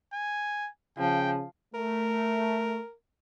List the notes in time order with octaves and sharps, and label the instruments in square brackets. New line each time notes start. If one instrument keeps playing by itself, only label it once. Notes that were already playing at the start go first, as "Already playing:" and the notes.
[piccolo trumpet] G#5
[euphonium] C#3 [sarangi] F3 [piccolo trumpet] G5
[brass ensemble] A3 [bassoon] A#4